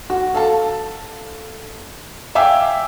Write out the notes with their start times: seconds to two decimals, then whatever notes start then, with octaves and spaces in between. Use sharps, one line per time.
0.10 F#4
0.34 A4 F5 A5
2.35 E5 F5 G5 G#5 D6 E6